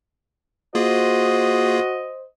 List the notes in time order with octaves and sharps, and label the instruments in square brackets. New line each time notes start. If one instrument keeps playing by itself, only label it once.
[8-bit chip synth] A#3 F4 G#4 [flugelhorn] F#4 [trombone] C5 [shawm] D#5